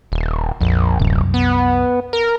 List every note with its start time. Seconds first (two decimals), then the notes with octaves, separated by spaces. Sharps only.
0.12 D#1
0.61 A#1 F2
0.99 D1 C2 F#2
1.34 B3
2.13 A#4